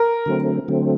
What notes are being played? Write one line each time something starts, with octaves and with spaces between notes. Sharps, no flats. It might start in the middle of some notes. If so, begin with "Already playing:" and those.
Already playing: A#4
D3 F#3 A3 C4
D3 F#3 A3 C4